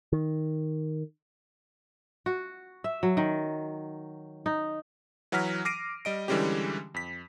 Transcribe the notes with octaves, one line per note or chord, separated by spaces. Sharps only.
D#3
F#4
E5
F#3
D#3
D#4
E3 F#3 F#5 A#5 F6 B6
D6 F6 A#6 C7 D7 D#7
G3 D#5 D7
D3 E3 G3 G#3 C#4 G4
F2 B6